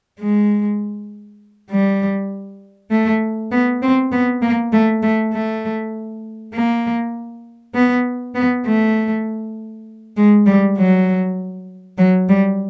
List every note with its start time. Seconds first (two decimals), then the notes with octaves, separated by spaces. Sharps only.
0.19 G#3
1.71 G3
2.91 A3
3.51 B3
3.82 C4
4.12 B3
4.42 A#3
4.72 A3
5.03 A3
5.33 A3
6.54 A#3
7.74 B3
8.35 B3
8.66 A3
10.17 G#3
10.46 G3
10.77 F#3
11.98 F#3
12.29 G3